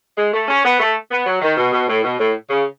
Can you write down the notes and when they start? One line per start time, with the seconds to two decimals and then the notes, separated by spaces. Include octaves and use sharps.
0.18 G#3
0.34 A3
0.48 C#4
0.64 B3
0.80 A3
1.11 B3
1.26 F#3
1.42 D#3
1.57 B2
1.73 B2
1.88 A2
2.04 B2
2.20 A2
2.50 C#3